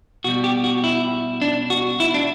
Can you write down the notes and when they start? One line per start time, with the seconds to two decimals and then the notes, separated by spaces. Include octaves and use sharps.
0.24 B2 G3 F#4
0.44 G4
0.64 F#4
0.84 E4
1.42 D4
1.70 F#4
2.00 E4
2.14 D4